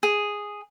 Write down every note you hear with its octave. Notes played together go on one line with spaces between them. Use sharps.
G#4